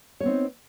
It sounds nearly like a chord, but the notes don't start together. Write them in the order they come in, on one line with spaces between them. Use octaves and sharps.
C#5 B3 C4 D#4